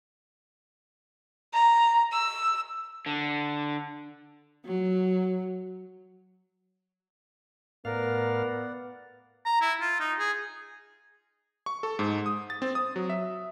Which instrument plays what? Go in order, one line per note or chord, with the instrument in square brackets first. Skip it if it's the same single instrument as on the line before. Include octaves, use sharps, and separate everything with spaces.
[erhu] A#5
E6
[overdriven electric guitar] D3
[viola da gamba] F#3
[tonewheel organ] A2 F5 [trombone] B3 [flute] A#4 [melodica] D5 F#5
[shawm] A#5
E4
F4
D#4
G#4
[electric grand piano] C#6
A4
G#2
D#6
A6
C4
D#6
F#3
E5